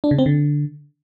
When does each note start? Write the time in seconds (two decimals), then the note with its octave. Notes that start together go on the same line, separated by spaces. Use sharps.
0.04 D4
0.11 C#3
0.18 C4
0.26 D3